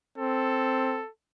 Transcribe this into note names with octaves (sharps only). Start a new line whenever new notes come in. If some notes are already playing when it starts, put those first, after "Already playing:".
C4 A4